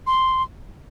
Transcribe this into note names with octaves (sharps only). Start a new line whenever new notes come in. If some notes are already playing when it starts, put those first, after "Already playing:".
C6